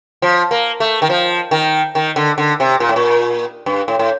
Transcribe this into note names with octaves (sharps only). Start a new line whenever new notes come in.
F3
A#3
A3
D#3
F3
D#3
D#3
D3
D3
C3
A#2
A2
A#2
G2
A2
A2